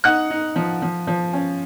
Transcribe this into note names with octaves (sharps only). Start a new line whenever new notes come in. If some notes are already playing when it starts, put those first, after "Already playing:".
D#4 F#5 F#6
D#4
F3
F3
F3
C#4